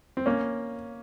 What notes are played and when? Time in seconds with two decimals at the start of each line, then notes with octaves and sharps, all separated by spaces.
0.17 C4
0.26 A#3 C#4